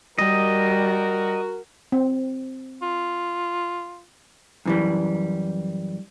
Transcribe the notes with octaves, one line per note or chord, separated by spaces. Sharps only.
G3 F#4 A#4 D#5
C4
F4
F#2 E3 G3